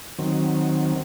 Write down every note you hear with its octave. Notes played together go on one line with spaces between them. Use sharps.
D#3 F#3 C4